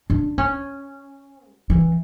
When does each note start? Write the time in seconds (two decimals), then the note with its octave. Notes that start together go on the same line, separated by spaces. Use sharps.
0.10 D4
0.38 C#4
1.49 F#3
1.70 E3